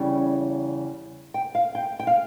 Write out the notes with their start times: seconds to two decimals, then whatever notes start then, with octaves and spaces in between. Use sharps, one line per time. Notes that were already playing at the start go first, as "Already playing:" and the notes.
Already playing: E2 C#3 G3 C#4
1.34 G5
1.55 F5
1.75 G5
1.99 G5
2.07 F5